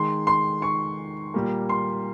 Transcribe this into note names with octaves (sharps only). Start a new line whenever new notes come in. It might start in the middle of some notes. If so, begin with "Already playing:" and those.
Already playing: D#3 G#3 C6
C6
C#6
A#2 G3 A#3
C6